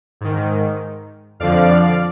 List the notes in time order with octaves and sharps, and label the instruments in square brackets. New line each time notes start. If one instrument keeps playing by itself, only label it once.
[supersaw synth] G#2 D#3
F2 D3 F3 D5 F5